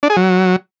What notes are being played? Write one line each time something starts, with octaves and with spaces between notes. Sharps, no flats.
D4
G#4
F#3